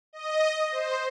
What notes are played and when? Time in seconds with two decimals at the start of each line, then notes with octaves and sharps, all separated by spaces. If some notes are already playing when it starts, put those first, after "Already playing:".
0.13 D#5
0.71 C5